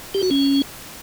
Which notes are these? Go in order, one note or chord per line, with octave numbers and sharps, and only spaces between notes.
G4
F#4
C#4